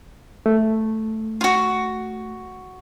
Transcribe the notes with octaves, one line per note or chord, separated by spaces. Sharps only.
A3
F4 F#4